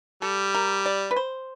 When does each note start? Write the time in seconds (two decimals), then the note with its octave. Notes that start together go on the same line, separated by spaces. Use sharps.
0.22 G3 A4
0.55 A#4
0.86 D5
1.11 B4
1.16 C5